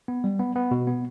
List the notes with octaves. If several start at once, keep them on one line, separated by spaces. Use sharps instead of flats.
B3
G3
B3
B3
B2
B3